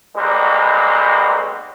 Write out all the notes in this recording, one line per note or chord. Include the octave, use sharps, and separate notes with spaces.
B1 G3 G#3 A#3 C4 F#4